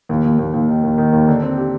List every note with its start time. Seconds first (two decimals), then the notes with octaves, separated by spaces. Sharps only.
0.09 D#2
0.24 D#2
0.39 D#2
0.53 D#2
0.68 D#3
0.83 D#2
0.98 D#3
1.13 D#2
1.28 D3
1.42 C4
1.57 G4